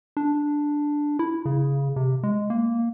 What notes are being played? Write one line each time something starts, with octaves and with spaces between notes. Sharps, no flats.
D4
E4
C#3
C3
G#3
A#3